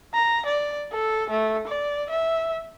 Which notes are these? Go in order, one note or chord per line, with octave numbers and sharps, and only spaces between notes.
A#5
D5
A4
A3
D5
E5